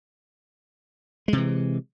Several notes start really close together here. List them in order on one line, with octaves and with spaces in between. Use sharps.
G#3 C3 E3